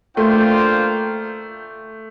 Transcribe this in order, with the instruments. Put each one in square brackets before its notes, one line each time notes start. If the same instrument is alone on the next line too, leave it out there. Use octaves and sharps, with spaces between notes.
[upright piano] A3 [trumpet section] A#3 D4 F4 C5 G5